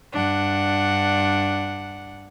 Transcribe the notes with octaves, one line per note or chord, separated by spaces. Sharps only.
G2 D4 F#5